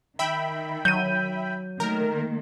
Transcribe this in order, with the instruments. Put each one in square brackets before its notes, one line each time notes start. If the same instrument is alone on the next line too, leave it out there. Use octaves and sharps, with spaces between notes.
[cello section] D#3 [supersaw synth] E5 G5 B5
[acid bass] F#3 [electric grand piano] G6 D#7
[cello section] D#3 A3 A#3 [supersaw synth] A#4